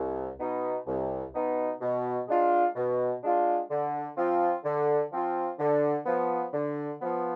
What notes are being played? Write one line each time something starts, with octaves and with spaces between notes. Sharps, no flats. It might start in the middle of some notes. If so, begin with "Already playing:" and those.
Already playing: C2
B2 B3 D#4
C2
B2 B3 D#4
B2
G#3 D4 F4
B2
G#3 D4 F4
D3
F3 C4 F4
D3
F3 C4 F4
D3
F3 B3
D3
F3 B3